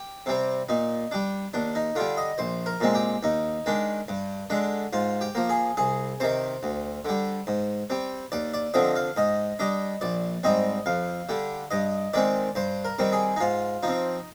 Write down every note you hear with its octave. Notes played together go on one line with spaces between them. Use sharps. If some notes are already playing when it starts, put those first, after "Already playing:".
Already playing: G4
C3 G3 C4
A#2 D#4
G3 D4
D#2 D4
D#4
D3 G3 F4
D#5
A#1 C5
A#4
A#2 G#3 C4
G4
D#2 D#4
D#3 G#3 D4
G2
D3 G#3 D4
G#2 F4
G4
F3 A#3
G#4
C2 G#4
C3 D#3 C5
D2
D3 G3
G#2
G3 C4
D#2 D5
D5
D3 F3 C4 D#5
F5
G#2 D#5
G3 D4 D#5
A#1 D5
G#2 G3 C4 D#5
F2 F5
D3 G3
G2 D#5
D#3 G#3 C4 D5
G2 C5
A#4
D#3 G3 C4
G#4
D#4
G#2 F4
F3 D#4
C4